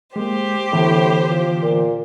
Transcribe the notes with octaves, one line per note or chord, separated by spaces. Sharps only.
G#3 A#3 G4 C5
A2 D3 E3 B3
F3
A#2